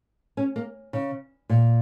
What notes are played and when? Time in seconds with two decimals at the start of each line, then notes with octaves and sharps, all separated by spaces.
0.37 C#4
0.56 A#3
0.93 C#3
1.49 A#2